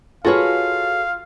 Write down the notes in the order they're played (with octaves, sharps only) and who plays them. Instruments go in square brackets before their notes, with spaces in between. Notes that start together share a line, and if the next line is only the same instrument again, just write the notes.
[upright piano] F4 [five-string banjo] F#4 G#4 B4 [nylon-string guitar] A4 C#5 [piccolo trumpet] F5